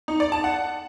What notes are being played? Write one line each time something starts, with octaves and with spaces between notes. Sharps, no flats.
D#4
D5
A5
F#5